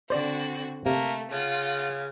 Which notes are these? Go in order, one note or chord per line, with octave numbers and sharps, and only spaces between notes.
D3 C4 F#4 C5 D5
C3 A3 A#3
C#3 F4 F#5